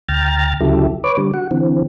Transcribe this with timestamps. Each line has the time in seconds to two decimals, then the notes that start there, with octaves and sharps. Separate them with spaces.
0.09 D2 G5 A#5 F6 A6
0.61 D2 C#3 F#3 E4 G4 A4
1.04 B4 C#5 D6
1.17 D3 G3
1.34 F#4 F#5
1.51 D3 E3 C4